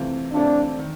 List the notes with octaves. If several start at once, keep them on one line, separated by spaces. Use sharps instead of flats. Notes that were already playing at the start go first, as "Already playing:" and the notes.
Already playing: C3 E3 A3 C4 F4
C3 E3 A3 C4 D4 F4
D#3